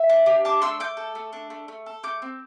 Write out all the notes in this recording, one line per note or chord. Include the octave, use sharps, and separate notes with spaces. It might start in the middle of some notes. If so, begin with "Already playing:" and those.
Already playing: E5
D4
G4
D4 A5 D6
A3 C6 E6
A3 D6 G6
A4
A3
D4
A3
A3
A4
A3 D6 G6
C4